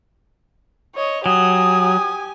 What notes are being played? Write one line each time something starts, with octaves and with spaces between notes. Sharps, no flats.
C#5 D#5
F#3 G4 G#5 D#6